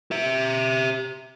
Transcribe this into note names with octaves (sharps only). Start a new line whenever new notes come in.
G4 E5